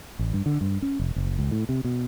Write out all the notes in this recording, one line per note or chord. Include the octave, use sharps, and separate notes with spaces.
A1
G2
D3
G2
C#4
F1
F#1
C#2
A2
C3
B2